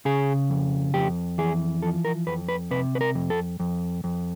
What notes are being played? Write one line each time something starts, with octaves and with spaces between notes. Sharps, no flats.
C#3 G#4
F2
F2 G4
E3 G#4
F3 A4
A#4
F2 B4
B4
C3 B4
B4
A#4
F2
A4
F2
F2